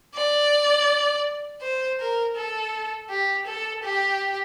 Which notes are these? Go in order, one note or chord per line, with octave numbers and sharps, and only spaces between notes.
D5
C5
A#4
A4
G4
A4
G4